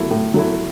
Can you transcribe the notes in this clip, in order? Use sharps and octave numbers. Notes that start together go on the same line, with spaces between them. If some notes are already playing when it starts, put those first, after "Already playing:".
Already playing: F#3 A3 E4
A2
F#3 A3 E4